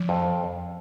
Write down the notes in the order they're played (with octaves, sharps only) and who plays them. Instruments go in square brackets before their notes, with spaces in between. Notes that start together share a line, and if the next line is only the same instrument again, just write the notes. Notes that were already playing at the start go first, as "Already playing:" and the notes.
Already playing: [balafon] F3
[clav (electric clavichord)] F2